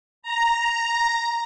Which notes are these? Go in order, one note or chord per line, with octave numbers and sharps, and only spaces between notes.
A#5